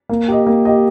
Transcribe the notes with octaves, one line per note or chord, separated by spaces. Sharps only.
A#3
G4 D#5
A#3
G4 D#5